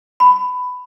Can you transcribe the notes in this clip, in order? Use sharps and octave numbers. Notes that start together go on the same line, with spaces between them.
B5